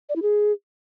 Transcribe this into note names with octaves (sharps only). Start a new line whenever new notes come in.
D5
E4
G#4